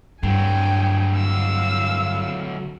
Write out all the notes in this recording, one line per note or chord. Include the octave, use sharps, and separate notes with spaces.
G2 D3 F#3 G5 G#5
F5 E6